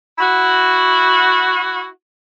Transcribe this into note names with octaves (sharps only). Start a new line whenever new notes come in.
E4 F#4